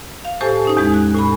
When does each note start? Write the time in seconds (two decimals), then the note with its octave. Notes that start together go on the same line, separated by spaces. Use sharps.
0.25 F5
0.41 A2 G4 A4 C5 G#5 A5
0.65 C#4 D#4 D#6
0.77 E2 G#3 G#6
0.93 G#5 F#6
1.15 A2 G#5 B5